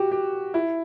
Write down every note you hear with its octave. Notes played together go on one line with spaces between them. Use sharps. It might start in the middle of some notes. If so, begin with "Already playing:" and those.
Already playing: F#4 G4
G4
E4